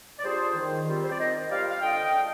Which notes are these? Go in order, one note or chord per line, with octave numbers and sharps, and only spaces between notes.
D5
G3 D4 F4 G#4 C5
D#3
G3 C4 F4
C5
D5
D#3 C5 D#5
G3 C4 F4 D5 F5
F5
D3 D#5 G5
G#3 D4